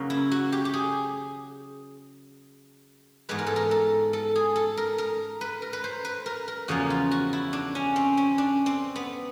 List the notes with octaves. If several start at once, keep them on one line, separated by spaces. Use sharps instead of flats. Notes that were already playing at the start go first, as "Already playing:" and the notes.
Already playing: C#3 F#3 A#3
E4
F#4
G4
G4
G#4
G#2 E3 G#3 B3 B4
A#4
A4
A#4
A4
A4
G#4
A4
A#4
A#4
B4
A#4
B4
C5
B4
A#4
A#4
E2 C#3 F3 A#3 F#4
F4
F#4
E4
D4
C#4
C4
C#4
D4
C4
B3